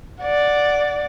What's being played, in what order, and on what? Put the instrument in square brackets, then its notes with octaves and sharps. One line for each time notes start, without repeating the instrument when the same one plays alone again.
[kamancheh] D5 F#5